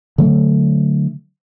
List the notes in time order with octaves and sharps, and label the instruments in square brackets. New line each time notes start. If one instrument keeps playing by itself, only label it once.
[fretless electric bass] D3 F#3 A3